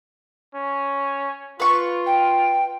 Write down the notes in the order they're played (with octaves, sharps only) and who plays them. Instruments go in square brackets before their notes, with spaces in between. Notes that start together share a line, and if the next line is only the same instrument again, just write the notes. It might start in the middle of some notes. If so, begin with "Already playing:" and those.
[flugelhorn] C#4
[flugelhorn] F4 [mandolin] B4 C#6
[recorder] G5